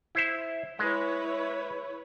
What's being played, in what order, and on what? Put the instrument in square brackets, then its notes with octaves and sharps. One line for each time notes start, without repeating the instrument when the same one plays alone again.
[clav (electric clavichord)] E4 C5 E5
[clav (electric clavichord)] G#3 [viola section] E4 B4 C#5